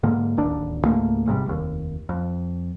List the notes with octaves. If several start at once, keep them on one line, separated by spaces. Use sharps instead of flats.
G#2 D3 A#3
D1 A1 D#2 D4
C#2 G#2 A3 A#3
A1 G#2 C3 G3
F1 D#2
F2